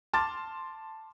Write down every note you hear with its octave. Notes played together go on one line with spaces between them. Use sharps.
A5 C6 D6 F6 A6